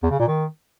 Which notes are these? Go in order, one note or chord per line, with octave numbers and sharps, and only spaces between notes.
E2
C#3
A#2
D#3